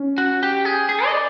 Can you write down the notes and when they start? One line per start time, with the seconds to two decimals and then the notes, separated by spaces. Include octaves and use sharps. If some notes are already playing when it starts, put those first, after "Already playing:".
Already playing: C#4
0.18 F#4
0.43 G4
0.65 G#4
0.89 G#4
1.06 D#5
1.13 D5